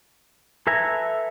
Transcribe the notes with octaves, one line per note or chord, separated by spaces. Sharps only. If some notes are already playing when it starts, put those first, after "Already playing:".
A4 B4 E5 G#5 A#5